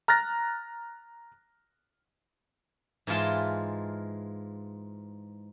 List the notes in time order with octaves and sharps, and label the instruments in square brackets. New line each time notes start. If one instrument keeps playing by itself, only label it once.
[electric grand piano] A#5 F6 F#6 A6 A#6
[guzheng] G#2 E3 G#3 F4 A5